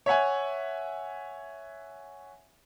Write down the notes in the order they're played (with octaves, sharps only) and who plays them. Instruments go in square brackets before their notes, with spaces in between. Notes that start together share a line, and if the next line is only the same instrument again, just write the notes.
[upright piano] C#5 E5 F#5 G#5